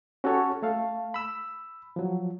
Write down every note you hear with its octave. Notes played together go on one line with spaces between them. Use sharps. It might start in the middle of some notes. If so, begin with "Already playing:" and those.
C#4 F#4 G4 A4 C#5
A3 A4 F5
B5 E6
F3 F#3